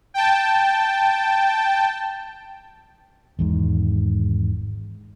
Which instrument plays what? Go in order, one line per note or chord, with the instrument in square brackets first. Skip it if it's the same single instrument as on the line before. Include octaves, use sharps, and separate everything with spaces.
[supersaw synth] G5 A5
[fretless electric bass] G#1 E2 G#2